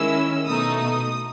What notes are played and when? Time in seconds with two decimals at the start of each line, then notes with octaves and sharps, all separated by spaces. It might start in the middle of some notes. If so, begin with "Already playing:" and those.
Already playing: D#3 G#3 C#4 E4 E6
0.47 B2 A3 D#4 D#6
0.81 D#6